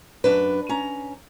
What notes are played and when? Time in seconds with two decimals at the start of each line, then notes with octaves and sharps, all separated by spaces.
0.24 F#2 D4 B4
0.69 C#4 A#5